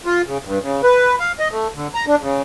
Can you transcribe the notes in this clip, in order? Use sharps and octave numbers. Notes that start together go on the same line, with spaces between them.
F4
C#3
G2
C#3
B4
F5
D#5
A3
D3
A#5
D4
C#3